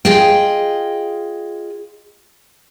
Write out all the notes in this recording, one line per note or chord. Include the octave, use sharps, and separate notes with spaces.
F4 G#4 D#5 G5